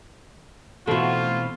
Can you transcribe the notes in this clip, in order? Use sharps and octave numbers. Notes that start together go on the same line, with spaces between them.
B2 E3 A3 C4 F4 F#4